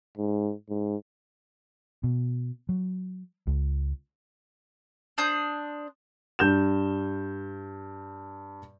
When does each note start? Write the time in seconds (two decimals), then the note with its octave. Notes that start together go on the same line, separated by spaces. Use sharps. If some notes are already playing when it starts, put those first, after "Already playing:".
0.17 G#2
0.70 G#2
2.04 B2
2.69 F#3
3.47 C#2
5.18 D4 C5 D#6 G6
6.39 G2 G6 E7